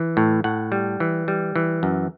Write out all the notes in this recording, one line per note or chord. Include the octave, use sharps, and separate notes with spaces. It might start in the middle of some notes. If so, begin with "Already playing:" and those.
Already playing: E3
A2
A2 F#5
G3
E3
G3
E3
F#2